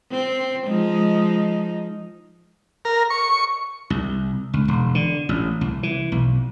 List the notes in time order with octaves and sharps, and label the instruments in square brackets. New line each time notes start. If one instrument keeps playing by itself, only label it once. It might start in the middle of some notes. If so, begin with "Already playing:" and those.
[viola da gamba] C4
F3 G#3 D#4
[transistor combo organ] A#4
C#6
[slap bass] C2
C#2
E1
D3
A1
C2
E3
B1